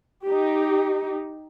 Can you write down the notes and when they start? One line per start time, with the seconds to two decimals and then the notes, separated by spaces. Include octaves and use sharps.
0.23 D#4 G4